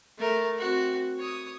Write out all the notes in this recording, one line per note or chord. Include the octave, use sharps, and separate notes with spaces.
A3 A#4
C4 F#4
C#5 D#6